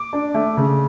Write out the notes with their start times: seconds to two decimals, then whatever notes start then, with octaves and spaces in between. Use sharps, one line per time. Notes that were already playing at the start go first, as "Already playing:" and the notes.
Already playing: D6
0.13 D4
0.34 A3
0.57 C#3